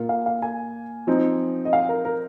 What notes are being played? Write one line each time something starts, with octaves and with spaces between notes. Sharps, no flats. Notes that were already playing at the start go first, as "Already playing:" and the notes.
Already playing: A#2 A#3 F4
F5
F5
G#5
F3 C4 D#4
D#5
F5
A#4
A#4